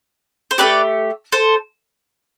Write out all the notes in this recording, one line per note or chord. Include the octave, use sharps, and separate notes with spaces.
C5
A3 C4 G4 B4 D5
A4 C5